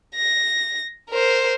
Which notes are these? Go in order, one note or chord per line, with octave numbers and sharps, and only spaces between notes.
A#6
A#4 C5